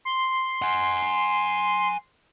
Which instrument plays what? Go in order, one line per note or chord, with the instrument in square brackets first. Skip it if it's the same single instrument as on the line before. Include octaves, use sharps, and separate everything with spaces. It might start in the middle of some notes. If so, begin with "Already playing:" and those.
[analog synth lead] C6
[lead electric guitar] F#5 G#5